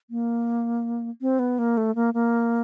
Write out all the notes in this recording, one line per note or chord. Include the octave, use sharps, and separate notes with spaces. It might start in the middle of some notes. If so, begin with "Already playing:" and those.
A#3
C4
B3
A#3
A3
A#3
A#3